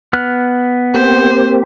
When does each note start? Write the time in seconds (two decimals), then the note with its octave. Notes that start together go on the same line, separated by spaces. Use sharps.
0.13 B3 F6 F#6
0.94 A#3 C4 G4 C5